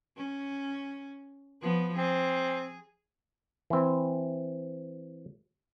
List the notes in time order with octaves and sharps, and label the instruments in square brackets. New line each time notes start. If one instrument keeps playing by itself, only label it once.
[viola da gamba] C#4
F3 B3
[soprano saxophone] C4 [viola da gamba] G#4
[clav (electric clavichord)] E3 C4